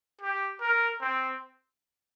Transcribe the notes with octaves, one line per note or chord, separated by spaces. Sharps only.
G4
A#4
C4